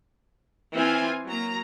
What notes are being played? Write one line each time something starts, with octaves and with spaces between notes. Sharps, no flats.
E3 C4 F4 G#5
F#3 A#3 A#5